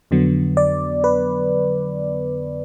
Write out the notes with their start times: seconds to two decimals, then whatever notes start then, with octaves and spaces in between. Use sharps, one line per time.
0.11 F2 D3 F#3 B3
0.57 D5
1.04 B4